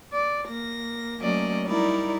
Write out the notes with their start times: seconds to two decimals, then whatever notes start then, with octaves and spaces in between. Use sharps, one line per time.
0.12 D5
0.48 A#3 A#6
1.20 F#3 A3 A#3 C#4 D5 D#5
1.67 G3 D#4 E4 A#4 D5